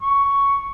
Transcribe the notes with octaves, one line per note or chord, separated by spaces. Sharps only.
C#6